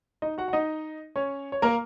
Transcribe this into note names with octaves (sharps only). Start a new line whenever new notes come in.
D#4 D#5
F#4 F#5
F#5
D#4 D#5
C#4 C#5
C#5
A#3 A#4